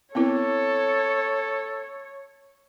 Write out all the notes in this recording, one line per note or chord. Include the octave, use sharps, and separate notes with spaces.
B3 C4 E4 A4 C#5